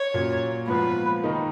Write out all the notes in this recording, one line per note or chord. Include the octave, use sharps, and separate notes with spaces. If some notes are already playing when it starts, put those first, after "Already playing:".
Already playing: C#5
A#2 F#3 C#4
G#2 F3 B3 F4 B4
D#3 A#3 D#4